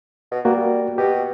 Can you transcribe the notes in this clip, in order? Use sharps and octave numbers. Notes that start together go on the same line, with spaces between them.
B2
G3 A#3 F#4
B2 G4